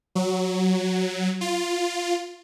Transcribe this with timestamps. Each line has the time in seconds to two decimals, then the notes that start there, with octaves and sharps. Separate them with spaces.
0.15 F#3
1.41 F4